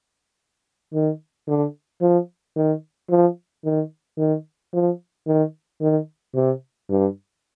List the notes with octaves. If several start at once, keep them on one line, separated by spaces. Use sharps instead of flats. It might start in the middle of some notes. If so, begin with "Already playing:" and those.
D#3
D3
F3
D#3
F3
D#3
D#3
F3
D#3
D#3
C3
G2